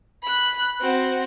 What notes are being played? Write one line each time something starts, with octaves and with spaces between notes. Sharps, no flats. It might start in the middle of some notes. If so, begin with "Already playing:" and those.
B5 F#6
C4 F#4